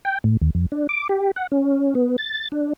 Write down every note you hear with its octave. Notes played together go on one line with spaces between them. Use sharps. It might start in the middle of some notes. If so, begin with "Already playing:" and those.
G5
A2
D#2
F2
D4
D6
G4
F#5
C#4
B3
A6
D4